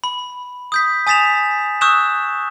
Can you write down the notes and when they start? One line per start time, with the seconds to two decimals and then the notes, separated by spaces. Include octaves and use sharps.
0.04 B5
0.72 D#6 G6 B6
1.07 G#5 D#6 A6 B6 E7 F7
1.81 C#6 D#6 E6 F#6 G6 E7